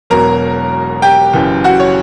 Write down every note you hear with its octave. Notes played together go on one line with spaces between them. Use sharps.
E1 E2 B2 F#3 A#4 A#5
G4 G5
F#1 F#2 E3
F#4 F#5
C#5